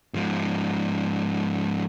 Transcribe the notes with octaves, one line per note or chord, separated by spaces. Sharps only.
G#2 F3